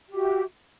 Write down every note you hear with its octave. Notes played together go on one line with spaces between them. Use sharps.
F#4 G4 E5